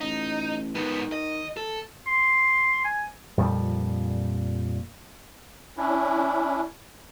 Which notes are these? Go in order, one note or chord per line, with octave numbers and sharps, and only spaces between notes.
A1 D#4
G#2 D#3 B3
D#5
A4
C6
G#5
F2 A#2 F3 G3
C#4 D4 E4